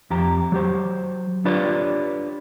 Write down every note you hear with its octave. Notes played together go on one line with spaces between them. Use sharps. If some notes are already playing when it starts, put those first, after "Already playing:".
F2 G4 A#5
F#3 G4 C5
D4 F4 G4 B4 C#5 D5